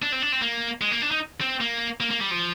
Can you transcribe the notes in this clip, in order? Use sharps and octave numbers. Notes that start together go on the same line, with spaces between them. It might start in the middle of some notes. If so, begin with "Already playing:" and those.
D4
C4
D4
C4
A#3
G#3
A#3
D4
D#4
C4
A#3
A#3
A#3
G3
F3